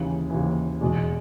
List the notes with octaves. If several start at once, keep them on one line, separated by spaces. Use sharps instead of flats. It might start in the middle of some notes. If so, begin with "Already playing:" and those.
Already playing: D#2 C#3 E3
D#2 C#3 E3
E2 B2 G#3